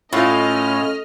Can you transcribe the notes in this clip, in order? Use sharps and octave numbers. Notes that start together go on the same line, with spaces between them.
A2 C#4 E4 F4 D#5 F5 F6